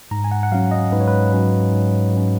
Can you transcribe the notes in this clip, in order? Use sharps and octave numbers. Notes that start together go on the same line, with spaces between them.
G#2 A#5
G#5
F#5
F#5
F#3 C#4 F5
D#5
G#2 B4
C#5
B4
F#3 C#4
G#2
F#3 C#4